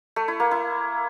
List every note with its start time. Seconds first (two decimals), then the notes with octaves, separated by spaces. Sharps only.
0.16 A3
0.28 E4
0.40 A#3
0.51 E4